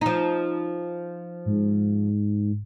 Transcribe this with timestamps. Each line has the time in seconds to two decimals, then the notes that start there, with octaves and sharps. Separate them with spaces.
0.01 F3 D#4
1.46 G#2